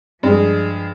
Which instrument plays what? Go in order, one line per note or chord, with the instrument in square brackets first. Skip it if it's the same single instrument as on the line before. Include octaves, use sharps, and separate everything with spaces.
[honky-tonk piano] G2 G#3 [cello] F3 G#4